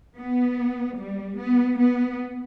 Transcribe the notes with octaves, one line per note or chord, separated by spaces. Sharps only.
B3
G3
B3
B3